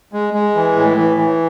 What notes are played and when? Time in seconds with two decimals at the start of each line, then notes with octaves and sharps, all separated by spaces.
0.13 G#3
0.34 G#3
0.55 E3
0.76 A2
0.97 E3
1.17 E3